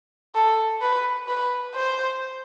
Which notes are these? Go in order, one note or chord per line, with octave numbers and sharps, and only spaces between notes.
A4
B4
B4
C5